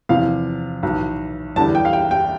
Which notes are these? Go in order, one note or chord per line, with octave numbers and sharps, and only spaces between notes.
E2 C3 F3 F5
B1 A2 E3
E2 D3 G3 A5
G5
F5
G5
G5